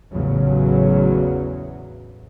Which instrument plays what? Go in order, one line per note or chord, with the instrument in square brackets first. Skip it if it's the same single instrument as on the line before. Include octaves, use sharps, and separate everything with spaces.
[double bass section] A1 E2 C#3 F#3